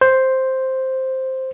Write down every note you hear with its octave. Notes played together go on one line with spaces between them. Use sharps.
C5